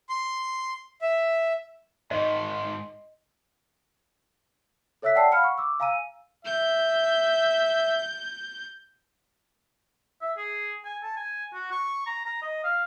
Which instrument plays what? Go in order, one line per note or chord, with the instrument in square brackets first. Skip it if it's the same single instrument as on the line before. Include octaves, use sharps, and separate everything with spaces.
[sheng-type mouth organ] C6
E5
[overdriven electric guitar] G#2 D#3 [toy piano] D#5 [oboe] C6
[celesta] A4 C#5 E5 E6 F#6 B6
D5 F#5 G5 A5 E6 C7
F5 F#5 B5 F6 C#7
C#6
D6 E6
F5 G#5 A#5 E6 D#7
[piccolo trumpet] E5 [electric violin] G6
[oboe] E5
G#4
G#5
A5
G#5
F#4
C#6
A#5
A#5
D#5
F5